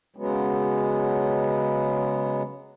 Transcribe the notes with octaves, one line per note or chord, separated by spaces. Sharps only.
C#3 F#3 G#3 B3